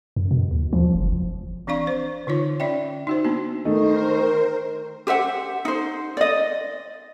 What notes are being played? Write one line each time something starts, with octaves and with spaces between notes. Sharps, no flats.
F#2
B2
D#2
F3
F#1
E3 C4 D4 D5 F5 C#6
C5
D3 D#4 F4 C#5
C#4 D5 E5 G5
D#4 F#4 C5
A#3 B3 D4 F#4
D#3 A3 D#4 A#4 C5
G4 C5 E5 F#5
D#4 C5
D5 D#5